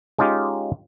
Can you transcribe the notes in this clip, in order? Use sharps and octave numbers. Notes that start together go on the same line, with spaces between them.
G#3 C#4 D#4 F4 G4